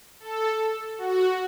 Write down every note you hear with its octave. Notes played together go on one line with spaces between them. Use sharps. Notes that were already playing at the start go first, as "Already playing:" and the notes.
A4
F#4